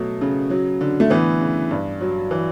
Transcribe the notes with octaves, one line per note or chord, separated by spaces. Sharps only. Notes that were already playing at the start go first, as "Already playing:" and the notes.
Already playing: B2 F#3 A3
C#3
F#3
D3
A3
E3 B3
C#3
G2
F#3
E3